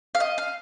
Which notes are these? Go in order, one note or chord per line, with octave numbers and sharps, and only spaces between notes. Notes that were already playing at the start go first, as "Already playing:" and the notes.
F5
D#5
F5